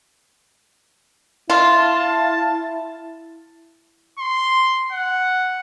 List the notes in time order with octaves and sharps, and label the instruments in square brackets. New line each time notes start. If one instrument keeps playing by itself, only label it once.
[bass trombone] E4 [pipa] F4 [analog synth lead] A5
[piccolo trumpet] C6
F#5